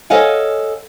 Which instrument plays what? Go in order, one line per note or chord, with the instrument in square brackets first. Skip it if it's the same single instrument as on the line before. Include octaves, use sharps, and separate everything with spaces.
[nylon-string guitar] A4 C#5 D#5 F5 F#5 G#5